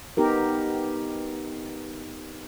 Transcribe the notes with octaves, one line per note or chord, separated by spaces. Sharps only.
B3 D#4 G4 A#4